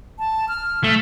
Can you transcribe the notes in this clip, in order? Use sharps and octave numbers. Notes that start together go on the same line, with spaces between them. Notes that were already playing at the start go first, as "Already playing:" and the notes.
A5
F6
A3